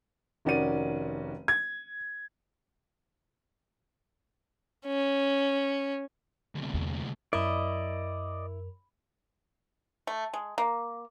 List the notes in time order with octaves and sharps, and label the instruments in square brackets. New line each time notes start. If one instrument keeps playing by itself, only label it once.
[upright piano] F1 D#3 C#4 F#4 D5 D#7
G#6
[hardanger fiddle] C#4
[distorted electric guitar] D2 C3
[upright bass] E2
[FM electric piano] F#2 A#4 [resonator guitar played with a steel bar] E4 [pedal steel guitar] D5 D#5
[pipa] A3
G#3
A#3